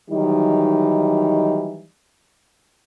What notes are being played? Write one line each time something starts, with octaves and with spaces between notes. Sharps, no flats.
D#3 E3 F#3 G3 D#4